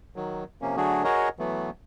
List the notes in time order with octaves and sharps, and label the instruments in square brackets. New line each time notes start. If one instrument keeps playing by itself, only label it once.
[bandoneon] D#3 F#3
C3 F3 A#3 C#4
D3 F#3 A3 D4 F#4 G#4
F#4 G#4 A#4 C#5 D#5
E3 F#3 A3 B3